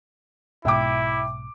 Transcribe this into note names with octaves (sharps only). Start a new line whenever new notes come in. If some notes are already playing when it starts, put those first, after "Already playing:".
B1 G#2 B2 E4 E5 G5 D6